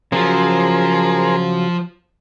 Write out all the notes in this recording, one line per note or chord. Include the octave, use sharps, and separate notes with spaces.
C#3 F3 F#3 G#4 A#4 C5